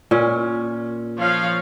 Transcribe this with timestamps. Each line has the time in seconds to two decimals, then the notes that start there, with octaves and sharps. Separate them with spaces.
0.11 A#2 C#4
1.17 F3 C#5 F5